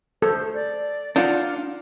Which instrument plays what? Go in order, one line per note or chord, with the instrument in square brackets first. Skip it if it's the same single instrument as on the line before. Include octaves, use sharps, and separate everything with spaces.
[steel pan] A4 [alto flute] C5
[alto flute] D5
[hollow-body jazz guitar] D4 [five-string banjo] D#4 F4 F#5 [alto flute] F5